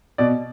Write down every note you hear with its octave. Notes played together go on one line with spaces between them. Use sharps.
B2 D5